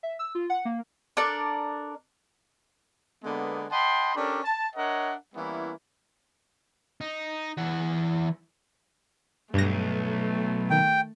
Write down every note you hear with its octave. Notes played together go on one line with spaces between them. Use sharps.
E5
E6
F4
F#5
A#3
D4 A4 A#4 D5
D3 G#3 A#3 B3
D#5 F#5 G5 A5 B5 C6
C#4 D4 G4 A4 A#4 D5
A5
D4 A#4 C#5 D#5 E5 F#5
E3 G3 A#3 B3 C#4 E4
D#4
E3 F#5
B1 G2 A3 A#6
D#3 G5